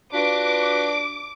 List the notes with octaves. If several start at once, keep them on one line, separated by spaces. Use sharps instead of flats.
D4 F4 F#4 B4 D6